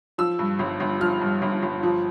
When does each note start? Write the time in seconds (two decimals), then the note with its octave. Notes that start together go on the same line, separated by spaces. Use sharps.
0.18 F3 E6
0.39 G2
0.59 G1
0.80 G1
1.01 F3 F6
1.21 G2
1.42 G1
1.62 G1
1.83 F3